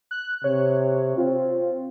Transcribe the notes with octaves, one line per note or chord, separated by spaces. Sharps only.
F#6
C3 C#5
C4 F4